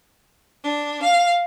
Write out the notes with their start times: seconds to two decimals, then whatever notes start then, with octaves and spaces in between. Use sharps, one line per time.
0.64 D4
1.03 F5